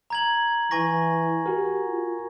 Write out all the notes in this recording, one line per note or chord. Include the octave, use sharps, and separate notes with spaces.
A#5 G#6 F#7
E3 G#5 C#6 A#6
F#4 G4 A#4
F4